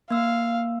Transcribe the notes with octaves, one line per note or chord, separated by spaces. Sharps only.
A#3 F5 E6